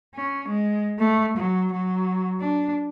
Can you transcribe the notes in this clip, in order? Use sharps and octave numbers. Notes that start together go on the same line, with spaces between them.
C#4
G#3
A3
F#3
F#3
D4